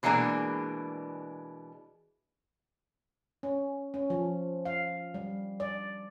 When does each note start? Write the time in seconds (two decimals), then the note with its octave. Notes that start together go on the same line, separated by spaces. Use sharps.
0.03 B2 E3 G#3 A#3 D4 G#4
3.43 C#4
3.94 C#4
4.10 F3
4.65 F5
5.14 G3
5.60 D5